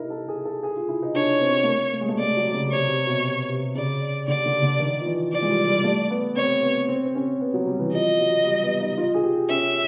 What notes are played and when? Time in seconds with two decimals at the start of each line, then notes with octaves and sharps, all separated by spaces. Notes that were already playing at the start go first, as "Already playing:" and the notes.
Already playing: D#4 E4 A#4
0.10 A4
0.28 G#4
0.45 A4
0.63 G#4
0.76 F4
0.89 E4
1.02 D#4
1.15 D4 C#5
1.41 C4
1.63 A3
1.67 A#3
1.93 A3
2.01 G#3
2.09 A3
2.19 A3 D5
2.37 F#3
2.54 C#3
2.72 C3 C#5
2.89 C3
3.07 B2
3.49 C3
3.75 C#3 D5
4.27 D3 D5
4.45 D3
4.62 D3
4.79 D#3
5.01 F3
5.06 E3
5.33 F3 D5
5.42 G#3
5.49 G3
5.68 G3
5.84 A3
6.10 B3
6.36 C4 C#5
6.63 B3
6.88 C4
7.06 C4
7.15 C#4
7.41 B3
7.54 F#3
7.66 G3
7.79 E3
7.93 F3 D#5
8.19 F#3
8.44 G3
8.63 B3
8.80 D#4
8.98 F4
9.14 G#4
9.23 G4
9.49 C#4 E5